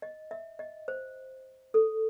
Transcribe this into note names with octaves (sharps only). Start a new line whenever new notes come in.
D#5
E5
D#5
C5
A4